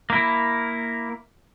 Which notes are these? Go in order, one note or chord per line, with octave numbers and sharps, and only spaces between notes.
A#3 E4